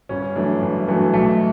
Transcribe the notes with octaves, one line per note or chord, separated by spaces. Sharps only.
G1 C#4
F#2 E3 A3 D4
G1
F#2 E3 A3 D4
B1 A3